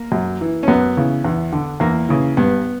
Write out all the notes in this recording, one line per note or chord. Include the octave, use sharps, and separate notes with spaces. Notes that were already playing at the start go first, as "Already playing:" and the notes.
Already playing: A#3
F#2
E3
C#4
F#2 B3
C#3 E3
E2
D3
E2 A#3
C#3 E3
G2 B3